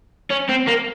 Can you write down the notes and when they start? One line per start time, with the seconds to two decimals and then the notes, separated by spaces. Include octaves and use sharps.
0.30 C#4
0.49 C4
0.68 A#3